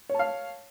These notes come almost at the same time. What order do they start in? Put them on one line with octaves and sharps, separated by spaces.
C#5 A5 F5